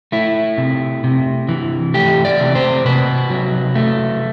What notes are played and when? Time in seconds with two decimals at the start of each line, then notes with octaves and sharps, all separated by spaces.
0.12 A3 E4
0.58 C3
1.04 C3
1.49 E3
1.94 A3 G4
2.25 D5
2.40 C3
2.55 C5
2.85 C3 B4
3.30 F#3
3.75 A3